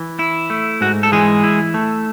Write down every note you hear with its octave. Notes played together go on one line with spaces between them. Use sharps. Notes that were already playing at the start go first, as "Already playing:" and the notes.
Already playing: E3
E4
A3
G#2 F#4
A4
E3 G#3 G#4
E4
A3